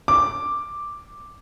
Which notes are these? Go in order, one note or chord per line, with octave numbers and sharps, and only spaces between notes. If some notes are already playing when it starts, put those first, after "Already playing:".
D6